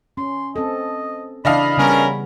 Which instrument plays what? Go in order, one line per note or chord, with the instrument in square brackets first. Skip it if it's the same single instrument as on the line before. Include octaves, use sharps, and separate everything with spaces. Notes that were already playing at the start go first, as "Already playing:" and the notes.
[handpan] C#4 [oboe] C6
[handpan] C4 A4 [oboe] D#5
[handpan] C#3 E3 E4 [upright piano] D4 D#5 F5 [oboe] B5
[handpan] C#3 G3 B3 [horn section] C#4 A#4